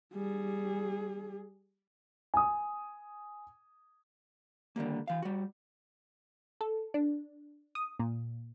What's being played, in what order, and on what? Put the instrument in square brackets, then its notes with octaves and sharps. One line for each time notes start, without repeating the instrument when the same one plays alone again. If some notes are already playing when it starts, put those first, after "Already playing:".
[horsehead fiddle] G3 G#4
[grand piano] G#5 D#6
[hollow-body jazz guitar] D3 D#3 G3 A#3
E3 F5
G3 F#4
[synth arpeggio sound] A4
D4
D#6
A#2